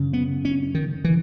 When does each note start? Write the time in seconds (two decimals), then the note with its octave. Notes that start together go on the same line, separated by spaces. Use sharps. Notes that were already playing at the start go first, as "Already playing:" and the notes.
Already playing: F#2 C#3
0.13 B3
0.45 C#4
0.75 D#3
1.04 E3